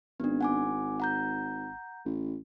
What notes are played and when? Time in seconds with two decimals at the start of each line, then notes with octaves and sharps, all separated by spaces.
0.20 G#1 B3 D4
0.41 F#5 G#5 D6
1.00 F#5 A#5 G6
2.05 A1